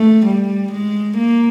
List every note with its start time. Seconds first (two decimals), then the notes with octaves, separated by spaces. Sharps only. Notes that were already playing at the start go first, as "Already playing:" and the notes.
Already playing: A3
0.26 G3
0.72 G#3
1.17 A#3